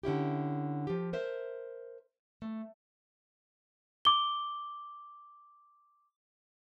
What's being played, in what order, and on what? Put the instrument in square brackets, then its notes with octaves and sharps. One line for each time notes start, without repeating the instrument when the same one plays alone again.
[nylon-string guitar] D3 C#4 E4 G4
F3 G4
A#4 C5 E5
A3
[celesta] D6 G7